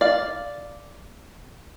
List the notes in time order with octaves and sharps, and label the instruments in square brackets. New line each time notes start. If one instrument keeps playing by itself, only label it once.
[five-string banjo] D5 F5